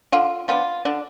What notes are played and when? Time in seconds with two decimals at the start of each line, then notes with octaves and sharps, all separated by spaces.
0.12 D3 F4
0.48 F3 B3 D4 F4
0.85 D3 D4